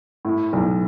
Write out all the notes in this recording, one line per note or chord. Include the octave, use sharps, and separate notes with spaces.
A2
B1